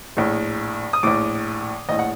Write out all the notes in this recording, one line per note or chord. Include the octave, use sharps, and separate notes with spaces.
A#1 A2
D#6
A#1 A2 D6
A#1 A2 D#5
F#5